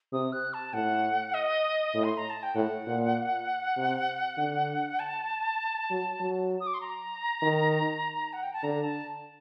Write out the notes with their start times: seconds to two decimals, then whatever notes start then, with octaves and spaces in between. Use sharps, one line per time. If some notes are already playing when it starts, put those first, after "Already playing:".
0.13 C3 D#6
0.32 F#6
0.53 A5
0.73 A2 F#5
1.34 D#5
1.94 A2
2.04 C6
2.17 A#5
2.30 A5
2.43 G5
2.56 A2 F#5
2.87 A#2
3.77 C3
4.38 D3
4.99 A5
5.91 F#3
6.20 F#3
6.60 D#6
6.67 D6
6.74 C6
6.81 A#5
7.42 D#3
8.33 F#5
8.43 G5
8.53 A5
8.63 D3 A#5
8.84 A5